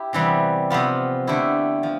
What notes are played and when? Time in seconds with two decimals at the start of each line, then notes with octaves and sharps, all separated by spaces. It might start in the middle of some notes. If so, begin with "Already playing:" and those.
Already playing: E4 G4
0.13 C3 E3 G3 B3
0.70 C3 F3 B3 F4
1.27 D3 A3 E4 G4
1.83 F3